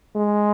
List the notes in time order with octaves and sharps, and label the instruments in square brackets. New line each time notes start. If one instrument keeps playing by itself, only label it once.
[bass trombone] G#3